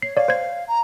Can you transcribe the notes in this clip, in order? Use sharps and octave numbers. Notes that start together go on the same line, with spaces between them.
C#5 C7
C#5 D5 F5
C5 G#6
A#5